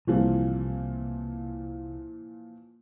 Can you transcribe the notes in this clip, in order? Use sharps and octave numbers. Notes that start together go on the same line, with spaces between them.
C2 A#2 E3 F3